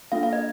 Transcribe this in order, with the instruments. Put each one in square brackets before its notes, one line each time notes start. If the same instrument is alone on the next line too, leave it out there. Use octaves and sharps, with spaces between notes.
[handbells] A#3 D4 F4 A4 F5
F5
D#5